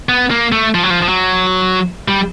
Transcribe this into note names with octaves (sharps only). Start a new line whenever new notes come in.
B3
A#3
A3
F3
F#3
F3
F3
F#3
G3